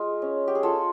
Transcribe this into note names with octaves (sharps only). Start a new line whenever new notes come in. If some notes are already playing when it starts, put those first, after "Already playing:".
Already playing: G#3 F4
C#4
G4
G#4
F4 A4